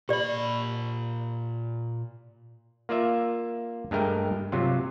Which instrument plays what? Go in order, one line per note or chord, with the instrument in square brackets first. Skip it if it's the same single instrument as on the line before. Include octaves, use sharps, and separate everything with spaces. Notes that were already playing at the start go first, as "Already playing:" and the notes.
[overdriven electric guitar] A#2 B5 [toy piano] G4 D5
[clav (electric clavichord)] A#3 F4 D5 E5
G2 G#3 A3 A#4 G5
C3 F#3 F4